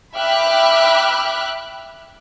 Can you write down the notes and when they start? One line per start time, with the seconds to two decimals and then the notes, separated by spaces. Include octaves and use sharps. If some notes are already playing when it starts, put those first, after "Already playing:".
0.15 E5 G5 B5 D6 F6 F#6